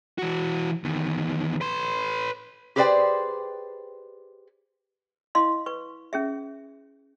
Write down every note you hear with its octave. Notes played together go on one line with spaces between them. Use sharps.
E3 F#4
E2 D#3
B4 C6
G4 G#4 B4 C5 D5 G5
E4 D#5 F5 C6
B4 C#6
C#4 G#4 E5